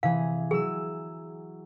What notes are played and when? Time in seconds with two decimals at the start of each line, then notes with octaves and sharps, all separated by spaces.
0.03 C3 E3 G#4 F5
0.51 F#3 G#4 E6